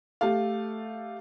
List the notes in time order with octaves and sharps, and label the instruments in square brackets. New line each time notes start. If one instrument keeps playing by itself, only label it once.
[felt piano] A3 G4 A4 F5